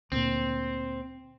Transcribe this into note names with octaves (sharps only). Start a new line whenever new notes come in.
D2 A#2 C4